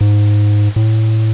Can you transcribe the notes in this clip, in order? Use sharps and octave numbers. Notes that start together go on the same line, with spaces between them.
G#2
A2